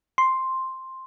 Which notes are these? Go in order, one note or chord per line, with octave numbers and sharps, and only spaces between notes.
C6